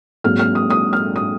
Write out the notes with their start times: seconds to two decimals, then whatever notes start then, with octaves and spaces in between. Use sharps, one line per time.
0.24 G#1 G#2 F#3 A#3 F6
0.39 F6
0.55 D#6
0.70 D#6
0.93 F6
1.16 D#6